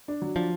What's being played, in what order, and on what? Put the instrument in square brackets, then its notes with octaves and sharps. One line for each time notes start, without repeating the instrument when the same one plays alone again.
[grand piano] D4
F#3
[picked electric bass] F3 [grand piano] D4